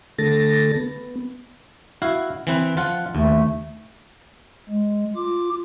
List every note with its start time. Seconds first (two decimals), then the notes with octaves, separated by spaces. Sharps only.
0.18 D3 A3 A4 A6 A#6
0.76 B3
2.02 E4 F#4 F5
2.47 E3 C4 B4
2.77 F3 F4 F#5
3.15 D#2 A3
4.69 G#3
5.16 F4 D6